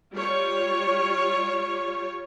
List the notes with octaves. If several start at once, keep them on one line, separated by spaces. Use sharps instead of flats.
G3 F4 C#5